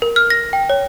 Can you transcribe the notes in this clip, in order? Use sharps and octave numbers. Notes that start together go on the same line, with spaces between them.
A#4
F6
A#6
G5
C#5